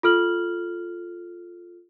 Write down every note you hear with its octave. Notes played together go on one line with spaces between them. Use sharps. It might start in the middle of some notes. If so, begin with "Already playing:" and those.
F4 A4 F6 F#7